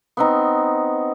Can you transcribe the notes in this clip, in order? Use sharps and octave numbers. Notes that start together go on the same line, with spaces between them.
B3 C4 D#4